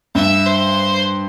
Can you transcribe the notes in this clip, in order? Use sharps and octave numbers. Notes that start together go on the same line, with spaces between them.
G2 E5
C5